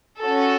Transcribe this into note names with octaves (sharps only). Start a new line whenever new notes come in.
C#4 F#4 A4